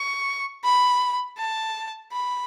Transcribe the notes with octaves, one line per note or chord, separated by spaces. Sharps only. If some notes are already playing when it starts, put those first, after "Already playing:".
Already playing: C#6
B5
A5
B5